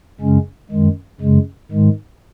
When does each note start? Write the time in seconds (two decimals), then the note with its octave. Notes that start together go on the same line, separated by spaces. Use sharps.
0.20 F#2 C#3 G#3 C#4
0.71 F#2 D#3 G#3
1.20 F#2 C#3 G#3
1.71 G#2 D#3 G#3